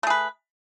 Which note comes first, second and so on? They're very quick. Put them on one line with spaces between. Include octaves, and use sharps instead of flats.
A3 G#4 B4